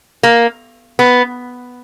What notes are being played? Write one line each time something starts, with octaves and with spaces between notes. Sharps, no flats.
A#3
B3